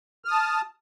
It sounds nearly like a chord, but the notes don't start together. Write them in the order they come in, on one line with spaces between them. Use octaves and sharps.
F6 D#6 A5